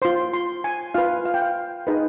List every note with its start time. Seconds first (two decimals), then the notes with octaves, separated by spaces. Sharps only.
0.02 F4 C5 C6
0.33 C6
0.64 G#5
0.94 F4 B4 F5
1.26 F5
1.34 G5
1.42 F5
1.87 D#4 G#4 B4 D#5